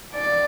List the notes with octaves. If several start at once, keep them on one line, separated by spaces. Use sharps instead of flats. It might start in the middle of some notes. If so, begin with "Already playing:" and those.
D5